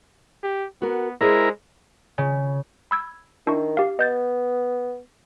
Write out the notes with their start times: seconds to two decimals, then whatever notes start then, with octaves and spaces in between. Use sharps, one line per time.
0.43 G4
0.82 B3 F#4 A#4
1.21 G#3 E4 G#4 A#4 C5 D5
2.18 C#3
2.91 B5 E6 G#6
3.47 D#3 D4 E4 C#6
3.77 G4 F5
3.99 B3 D#5 G6 A6